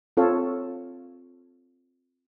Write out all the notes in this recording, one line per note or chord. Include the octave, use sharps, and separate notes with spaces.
C4 F4 A4 C#5 F5